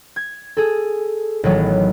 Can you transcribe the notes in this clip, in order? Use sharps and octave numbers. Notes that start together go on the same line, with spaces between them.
G#6
G#4 A4
A1 D#3 F#3 B3